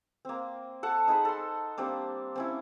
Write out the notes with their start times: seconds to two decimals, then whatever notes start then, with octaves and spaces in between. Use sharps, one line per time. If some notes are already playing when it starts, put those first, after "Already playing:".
0.25 A#3 C4
0.83 A4 F#5 A5
1.08 D#4 G#4 C5 B5
1.25 A4 C6
1.78 G3 A#3 C4 D4
2.36 C4 C#4 E4